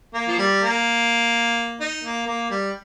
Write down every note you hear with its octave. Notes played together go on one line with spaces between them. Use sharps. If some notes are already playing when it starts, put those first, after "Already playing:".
A#3
F3
G3
A#3
D#4
A#3
A#3
G3